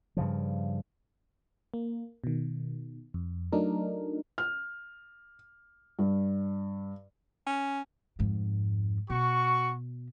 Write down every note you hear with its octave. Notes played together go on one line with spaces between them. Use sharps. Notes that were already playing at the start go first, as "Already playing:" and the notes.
G2 C#3 F3
A#3
B2 D#3
F2
F#3 A3 D4 D#4 A#4
F6
G2
C#4
F2 G#2
B2 F#4 C#6